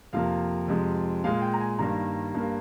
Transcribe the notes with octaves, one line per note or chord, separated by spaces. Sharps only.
F2 C3 F3 A#3 F5
F2 C3 F3 G#3
A#2 G#3 F5
G5
A#5
G#5
G2 D#3 G3 A#3 A#5
G2 G3 A#3